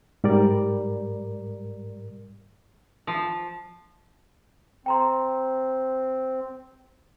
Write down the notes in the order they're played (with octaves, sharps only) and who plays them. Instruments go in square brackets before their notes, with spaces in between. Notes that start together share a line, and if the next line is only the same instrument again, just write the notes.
[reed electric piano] G#2 G3 A#4 D5
[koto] F3
[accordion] C4 [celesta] G5 A#5 C6